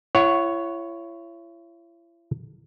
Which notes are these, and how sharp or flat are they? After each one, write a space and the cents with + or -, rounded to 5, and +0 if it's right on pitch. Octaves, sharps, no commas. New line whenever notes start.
E4 +40 C#5 +0 F#5 +0